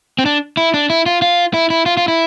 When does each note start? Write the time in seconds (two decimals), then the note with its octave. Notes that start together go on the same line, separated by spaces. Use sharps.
0.19 C4
0.26 D4
0.57 E4
0.74 D4
0.90 E4
1.06 F4
1.22 F4
1.54 E4
1.70 E4
1.86 F4
1.97 F4
2.08 E4